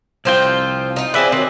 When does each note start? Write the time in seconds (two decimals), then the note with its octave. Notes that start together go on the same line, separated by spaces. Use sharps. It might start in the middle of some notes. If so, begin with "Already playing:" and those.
0.25 C2 F3 C4 F4 C5 G5
0.96 D#4 F4
1.14 C4 G#4 B4 D5 E5
1.32 D#3 F#3 C4